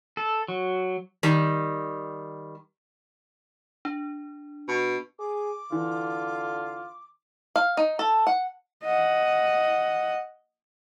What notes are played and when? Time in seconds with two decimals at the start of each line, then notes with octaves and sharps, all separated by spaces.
0.17 A4
0.48 F#3
1.23 D#3 G3
3.85 D4
4.68 B2
5.19 G#4 D6
5.72 D3 E3 F4
7.56 F5
7.77 D#4
7.99 A4
8.27 F#5
8.84 D#5 F#5